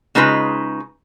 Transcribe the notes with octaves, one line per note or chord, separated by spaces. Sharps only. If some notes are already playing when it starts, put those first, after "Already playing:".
C#3 G#3 D#4 F4 B4